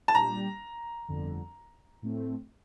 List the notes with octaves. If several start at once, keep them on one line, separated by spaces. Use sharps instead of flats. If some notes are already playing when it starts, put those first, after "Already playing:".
A5
A#2 G3 D4 G4 A#5
G1 F2 D3
A2 A3 C4